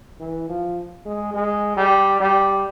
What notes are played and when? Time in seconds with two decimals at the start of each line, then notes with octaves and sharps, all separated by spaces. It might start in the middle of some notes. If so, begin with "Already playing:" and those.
0.20 E3
0.49 F3
1.05 G#3
1.34 G#3
1.77 G3
2.20 G3